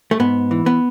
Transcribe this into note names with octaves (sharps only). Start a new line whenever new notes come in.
A3
G#2 B3
E3
B3